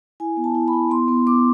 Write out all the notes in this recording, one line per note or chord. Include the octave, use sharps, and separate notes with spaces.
E4 G#5
B3
A5
E4
B5
E4
B3 C6
B3
B3 D6